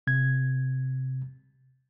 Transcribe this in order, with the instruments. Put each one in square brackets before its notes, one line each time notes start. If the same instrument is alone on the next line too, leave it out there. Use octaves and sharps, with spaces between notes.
[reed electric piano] C3 G#6